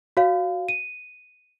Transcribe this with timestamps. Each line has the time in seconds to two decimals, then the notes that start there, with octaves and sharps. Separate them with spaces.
0.17 F#4 C#5 F5
0.69 D#7